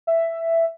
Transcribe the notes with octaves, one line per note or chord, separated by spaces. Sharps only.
E5